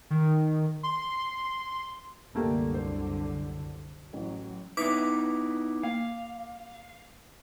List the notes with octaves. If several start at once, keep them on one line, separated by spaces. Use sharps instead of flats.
D#3
C6
C2 F#2 D3 A3 A#3 G4
C5
A1 F#3
B3 D#4 E4 B4 E5 D6 B6
A#3 F5